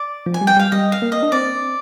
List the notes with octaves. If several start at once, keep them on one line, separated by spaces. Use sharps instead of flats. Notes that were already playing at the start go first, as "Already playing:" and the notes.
Already playing: D5
F3
G#5
G3
G5
G3 F5
G3 D#5
F5
A#3
D#5
D4
C4 D5